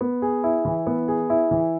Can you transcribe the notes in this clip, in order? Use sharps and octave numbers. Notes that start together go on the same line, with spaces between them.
B3
G#4
E4
E3
B3
G#4
E4
E3